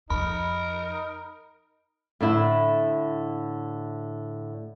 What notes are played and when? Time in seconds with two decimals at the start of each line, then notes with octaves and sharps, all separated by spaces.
0.10 F2 D#4 A#4 B5
2.21 A2 D3 E4